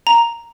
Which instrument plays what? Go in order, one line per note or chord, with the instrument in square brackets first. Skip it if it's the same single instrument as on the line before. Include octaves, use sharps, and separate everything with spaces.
[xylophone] A#5